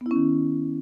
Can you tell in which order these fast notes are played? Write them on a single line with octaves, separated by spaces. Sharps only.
B3 E4 C#4 D#3